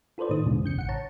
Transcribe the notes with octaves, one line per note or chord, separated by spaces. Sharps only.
F4 A4 B4 C5 D5
A2 D#3 D#4 D#6
E2 B2 D3 E3 G#3
F#2 C#3 G6 C#7
A1 F#5 C#7
C#5 A5 A#5